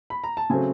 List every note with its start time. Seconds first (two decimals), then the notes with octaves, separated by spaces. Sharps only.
0.10 B5
0.24 A#5
0.37 A5
0.50 C#3 F#3 A3 C4 G#5